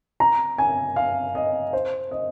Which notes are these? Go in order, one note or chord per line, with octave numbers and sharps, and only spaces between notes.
A#5
G#5
F5
D#5
C5
D#5